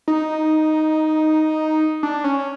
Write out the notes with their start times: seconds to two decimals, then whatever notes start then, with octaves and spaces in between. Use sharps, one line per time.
0.08 D#4
2.03 D4
2.24 C#4
2.39 C#4